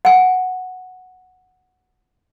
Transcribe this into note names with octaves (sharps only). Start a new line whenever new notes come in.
F#5 G#5